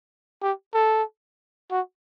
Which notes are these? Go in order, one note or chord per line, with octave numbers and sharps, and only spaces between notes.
G4
A4
F#4